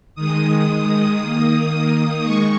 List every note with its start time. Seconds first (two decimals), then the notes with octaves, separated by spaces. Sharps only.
0.15 D#3 G#3 D#6
1.20 D#3 A#3
2.22 D#3 G#3 C#6